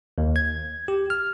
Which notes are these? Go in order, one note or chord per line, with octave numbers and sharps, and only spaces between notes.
D#2
G#6
G4
F6